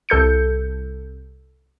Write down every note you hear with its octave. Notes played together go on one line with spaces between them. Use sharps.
C2 A4 G6 C#7